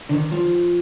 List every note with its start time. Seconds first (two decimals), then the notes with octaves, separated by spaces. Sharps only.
0.09 D3
0.13 D#3
0.32 F3